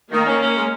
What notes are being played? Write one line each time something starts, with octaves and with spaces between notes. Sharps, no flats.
D#3 A#3 A#4
C#4
C#4
G#3